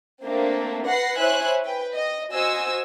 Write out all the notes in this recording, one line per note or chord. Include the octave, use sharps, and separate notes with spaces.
A3 A#3 C4 D4
B4 F#5 A#6 C7
E4 C5 C#5 E5 G#5 F#6
B4 G5
D#5
F#4 C5 D#5 G#5 E6